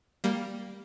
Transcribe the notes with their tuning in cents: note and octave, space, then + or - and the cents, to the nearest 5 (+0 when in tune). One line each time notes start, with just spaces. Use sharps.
G3 +0 A#3 +0